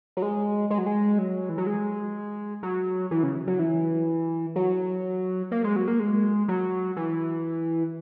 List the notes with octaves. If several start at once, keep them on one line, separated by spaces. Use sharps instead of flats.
F#3
G#3
G#3
F#3
G#3
F#3
E3
F#3
G#3
F#3
E3
C#3
F#3
E3
F#3
A#3
G#3
F#3
A#3
G#3
F#3
E3